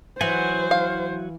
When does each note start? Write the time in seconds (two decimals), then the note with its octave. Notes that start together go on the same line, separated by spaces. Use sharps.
0.21 E3 F#3 C5 F#5 G#5
0.71 F5